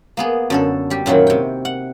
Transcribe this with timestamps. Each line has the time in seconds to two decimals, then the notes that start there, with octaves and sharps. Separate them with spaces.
0.17 A#3 B3 G#4
0.50 F#2 D3 A4
0.90 G3 G4
1.06 F#2 A#2 D#3 F#3 E4
1.27 C3 G5
1.65 F#5